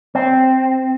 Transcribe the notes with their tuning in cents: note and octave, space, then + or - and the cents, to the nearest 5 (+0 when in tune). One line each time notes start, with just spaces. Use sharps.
C4 -5